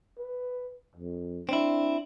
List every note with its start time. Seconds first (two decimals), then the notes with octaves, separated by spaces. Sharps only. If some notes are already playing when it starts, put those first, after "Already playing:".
0.19 B4
0.96 F2
1.49 C4 D4 E4